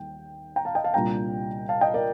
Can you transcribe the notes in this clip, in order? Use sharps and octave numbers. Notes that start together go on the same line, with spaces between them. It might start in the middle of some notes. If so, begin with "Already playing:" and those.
Already playing: D#2 D#3 G3 G5
G5 A#5
F5 A5
D#5 G5
F5 A5
C2 A#2 G3 D4 G5 A#5
F5 A5
D#5 G5
A#4 D5